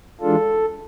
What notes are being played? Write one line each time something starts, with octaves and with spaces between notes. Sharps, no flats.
E3 G#3 D4 F4 A4